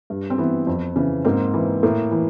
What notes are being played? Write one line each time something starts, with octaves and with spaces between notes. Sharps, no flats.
G2
C4
E3 B3
F2
C#3 E3
G#2 A#3 C4
E3
A2 A#3
E3